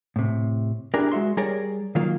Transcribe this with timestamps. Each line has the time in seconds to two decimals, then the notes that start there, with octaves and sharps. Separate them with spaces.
0.16 A2 C3
0.94 D4 E4 G4 G#4 A#4
1.12 G#3 F#4 E5 C6
1.37 G3 G#4 A#4 C#5 D5
1.95 D#3 F#3 A#3 F4